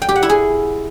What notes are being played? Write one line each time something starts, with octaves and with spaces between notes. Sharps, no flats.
G5
G4
F#5
E4
G#4